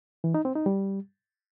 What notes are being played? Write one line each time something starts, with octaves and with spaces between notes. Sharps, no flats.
E3
D#4
C4
D#4
G3